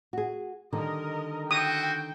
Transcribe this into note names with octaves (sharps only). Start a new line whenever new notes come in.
F#4 G#4
D3 D#3 G3 A#4 D#5
E4 F#4 C5 G5 D#6